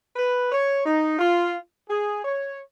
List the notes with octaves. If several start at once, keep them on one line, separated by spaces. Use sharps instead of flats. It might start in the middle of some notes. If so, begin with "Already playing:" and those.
B4
C#5
D#4
F4
G#4
C#5